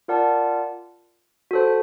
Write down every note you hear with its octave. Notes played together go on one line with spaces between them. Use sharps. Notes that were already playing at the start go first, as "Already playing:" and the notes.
F4 A#4 D5 F#5 A5
F#4 A4 C5